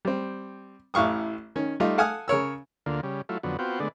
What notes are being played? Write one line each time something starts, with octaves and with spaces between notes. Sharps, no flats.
G3 C4
A1 A2 F5 C#6 D#6
D#3 C#4
G3 A3 D#4 F4
A4 F5 F#5 G#5 D#6 F6
C#3 A#4 C#5 E6
D2 D3 A#3 F4
C#3 G3
F#3 A3 E4 F4
F2 D3 F#3 B3
B3 C4 F4 F#4 G5
D3 G#3 A3 B3 D4